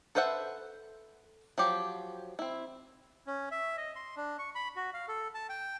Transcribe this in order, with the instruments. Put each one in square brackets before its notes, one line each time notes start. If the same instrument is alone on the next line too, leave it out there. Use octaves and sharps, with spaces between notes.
[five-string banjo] A4 B4 C5 E5 F#5
F3 F#3 G4
C4 E4
[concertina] C#4
E5
D#5
C6
D4
C#6
B5
F#4
F5
A4
A5
G5